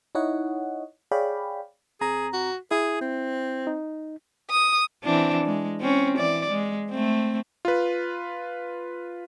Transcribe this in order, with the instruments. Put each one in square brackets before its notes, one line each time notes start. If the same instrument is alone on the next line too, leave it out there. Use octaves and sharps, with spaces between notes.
[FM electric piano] D#4 E4 C#5 D#5 F#5
G#4 C#5 D5 F5 G5 B5
[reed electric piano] D#2 C4 A#5 [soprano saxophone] G#4
[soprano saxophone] F#4
[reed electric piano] E4 [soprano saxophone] G#4
[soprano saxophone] C4
[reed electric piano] D#4
[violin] D#6
[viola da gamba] E3 C4 D4
G#3
C4 C#4
E3 D5
G#3
A3 C4
[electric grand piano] F4 B4